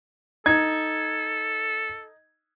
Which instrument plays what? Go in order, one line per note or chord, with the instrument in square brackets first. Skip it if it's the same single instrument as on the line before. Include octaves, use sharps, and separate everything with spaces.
[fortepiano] D#4 [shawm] A4 [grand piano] G#6